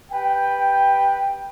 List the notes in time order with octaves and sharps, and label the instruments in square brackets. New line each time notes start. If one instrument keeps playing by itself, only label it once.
[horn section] G4 B4 G5